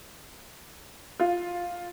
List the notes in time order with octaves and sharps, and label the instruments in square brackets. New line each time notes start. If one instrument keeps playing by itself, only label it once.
[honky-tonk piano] F4